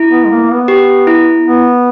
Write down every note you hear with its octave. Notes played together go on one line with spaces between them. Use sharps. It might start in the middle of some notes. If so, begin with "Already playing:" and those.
Already playing: E4
B3
G#3
A#3
B3
G4
E4
B3